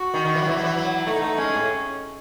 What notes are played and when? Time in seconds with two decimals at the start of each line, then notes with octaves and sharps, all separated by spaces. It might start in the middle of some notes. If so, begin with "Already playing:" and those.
Already playing: F#4
0.14 D#3
0.25 D#3
0.35 E3
0.42 F#3
0.46 E3 E4
0.57 F#3
0.64 E3
0.76 F#3
1.06 A3 D#4
1.22 A3
1.38 G#3 C#4
1.54 A2